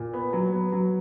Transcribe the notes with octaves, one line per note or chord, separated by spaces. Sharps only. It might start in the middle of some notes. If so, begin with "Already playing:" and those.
Already playing: A#2
B3
F#3
B3
F#3